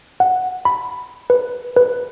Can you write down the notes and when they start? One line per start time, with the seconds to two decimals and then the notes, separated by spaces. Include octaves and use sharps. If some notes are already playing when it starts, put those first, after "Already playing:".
0.20 F#5
0.65 B5
1.30 B4
1.76 B4